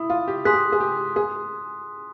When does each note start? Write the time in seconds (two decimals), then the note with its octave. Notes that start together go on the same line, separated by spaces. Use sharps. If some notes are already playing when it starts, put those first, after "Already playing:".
Already playing: E4 D#6
0.10 F4
0.28 G4
0.45 G#4 C6 D#6 F#6 B6
0.54 G4
0.72 G#4
0.80 G4
1.16 G#4